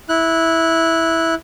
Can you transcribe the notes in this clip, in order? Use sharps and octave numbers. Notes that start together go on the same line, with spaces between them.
E4 F#6